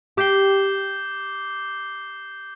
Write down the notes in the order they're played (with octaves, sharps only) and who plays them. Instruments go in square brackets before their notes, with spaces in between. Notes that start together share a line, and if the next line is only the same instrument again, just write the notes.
[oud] G4 [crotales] D6 G6 C7 G7